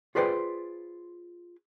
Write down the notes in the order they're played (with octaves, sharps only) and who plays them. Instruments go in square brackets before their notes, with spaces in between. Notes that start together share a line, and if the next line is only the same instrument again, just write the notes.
[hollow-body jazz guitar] F4 G#4 B4 C5 D5 G5